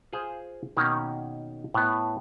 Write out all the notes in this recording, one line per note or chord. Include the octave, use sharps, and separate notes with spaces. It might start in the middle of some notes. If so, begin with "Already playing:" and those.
F4 G#4 C5
B2 D#3 A#3 C#4
A2 B3